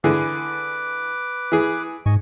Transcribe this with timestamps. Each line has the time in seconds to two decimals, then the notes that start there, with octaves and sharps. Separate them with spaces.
0.04 D3 E3 G#4 B4 D6
1.52 E3 G#4
2.06 G#2 D#5 G#5 C#6